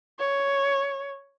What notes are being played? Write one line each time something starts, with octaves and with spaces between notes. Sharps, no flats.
C#5